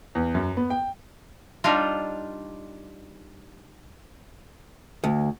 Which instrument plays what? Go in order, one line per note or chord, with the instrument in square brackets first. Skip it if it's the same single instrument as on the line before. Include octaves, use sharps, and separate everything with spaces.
[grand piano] E2
F#2
B3
G5
[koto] G3 D4 D#4 F4
[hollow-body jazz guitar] D2